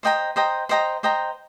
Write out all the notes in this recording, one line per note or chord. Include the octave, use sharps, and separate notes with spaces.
C5 D#5 G5 A#5
C5 D#5 G5 A#5
C5 D#5 G5 A#5
C5 D#5 G5 A#5